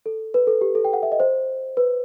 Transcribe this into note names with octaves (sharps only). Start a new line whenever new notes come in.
A4
B4
A4
G4
A4
G5
F#5
E5
D#5
C5
B4